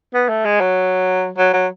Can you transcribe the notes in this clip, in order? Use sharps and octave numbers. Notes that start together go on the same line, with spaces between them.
B3
A3
G#3
F#3
F#3
F#3